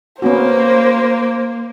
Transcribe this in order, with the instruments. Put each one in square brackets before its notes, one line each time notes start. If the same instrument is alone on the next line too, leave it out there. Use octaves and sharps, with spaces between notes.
[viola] A#3 [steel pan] B3 C#4 F#4 [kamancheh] C5